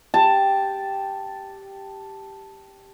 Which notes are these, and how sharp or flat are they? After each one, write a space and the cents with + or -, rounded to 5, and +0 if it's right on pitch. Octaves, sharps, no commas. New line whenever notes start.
G4 +0 A5 +0